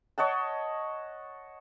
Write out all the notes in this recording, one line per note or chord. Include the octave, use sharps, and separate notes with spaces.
C#5 D#5 F#5 A5